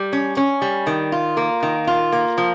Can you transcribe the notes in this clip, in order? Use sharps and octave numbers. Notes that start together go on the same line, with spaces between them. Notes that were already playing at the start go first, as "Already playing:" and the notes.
Already playing: G3
C#4
C#4
G3
D#3
F4
A#3
D#3
F4
A#3
F3